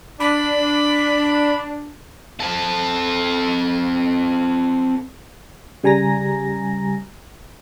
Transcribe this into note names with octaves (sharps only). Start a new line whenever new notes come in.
D4 B5
C4 A4
C#3 G3 G#5 A#5 A#6